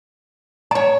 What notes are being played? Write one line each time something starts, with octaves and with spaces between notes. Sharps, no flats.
C#5 D5 A#5